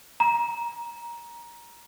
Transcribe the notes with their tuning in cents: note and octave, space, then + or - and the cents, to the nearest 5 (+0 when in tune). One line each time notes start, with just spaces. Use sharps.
A#5 +15